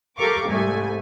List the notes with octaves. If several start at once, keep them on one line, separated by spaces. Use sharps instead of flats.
G4 A4 A#4 F5 C#6 D6
C2 G#2 A3 G#5